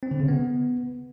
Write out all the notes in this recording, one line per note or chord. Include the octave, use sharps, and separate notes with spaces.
C4
D3
C#3
B3